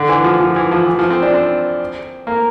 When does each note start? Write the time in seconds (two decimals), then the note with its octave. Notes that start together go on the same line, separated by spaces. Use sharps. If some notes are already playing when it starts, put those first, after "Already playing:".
Already playing: D3
0.09 E3
0.24 F3
0.40 F3
0.56 E3
0.71 F3
0.86 E3
0.99 F3
1.10 C4
1.22 D4
1.34 C4
2.27 A#3